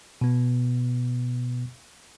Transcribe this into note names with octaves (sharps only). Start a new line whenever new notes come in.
B2 B3